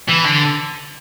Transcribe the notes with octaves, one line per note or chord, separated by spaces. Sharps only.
E3
D3